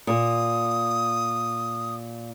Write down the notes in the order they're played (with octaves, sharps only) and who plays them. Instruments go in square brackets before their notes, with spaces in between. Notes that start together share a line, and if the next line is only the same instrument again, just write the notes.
[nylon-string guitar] A#2 [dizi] D#6